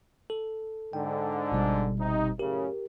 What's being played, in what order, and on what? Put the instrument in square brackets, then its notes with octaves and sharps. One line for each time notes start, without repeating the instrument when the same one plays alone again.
[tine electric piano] A4
[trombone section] G#2 D3 [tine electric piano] G5
[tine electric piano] G1 B2 G3
[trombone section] C3 D#4
[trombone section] F#2 A2 C#3 [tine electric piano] G4 A#4